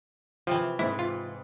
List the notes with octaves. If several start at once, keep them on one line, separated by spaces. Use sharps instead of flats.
C3 E3 F3
G#2 C4 E4
F4